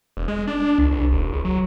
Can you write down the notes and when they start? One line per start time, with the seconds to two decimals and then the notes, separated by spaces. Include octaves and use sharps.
0.17 E1
0.28 G#3
0.47 D4
0.78 C#2
0.91 C2
1.11 D#1
1.32 C#2
1.45 F#3